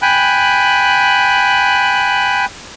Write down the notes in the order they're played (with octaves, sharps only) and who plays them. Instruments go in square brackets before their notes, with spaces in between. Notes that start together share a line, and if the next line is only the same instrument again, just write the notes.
[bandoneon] G5 G#5 B5 F#6